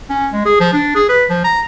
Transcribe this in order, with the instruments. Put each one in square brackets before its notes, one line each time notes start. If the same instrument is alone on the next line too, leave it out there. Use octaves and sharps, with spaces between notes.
[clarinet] C#4
G#3
G#4
F3
D4
G#4
B4
F3
A#5